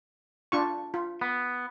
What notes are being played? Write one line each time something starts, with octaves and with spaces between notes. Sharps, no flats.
D4 F4 C#6
F4
B3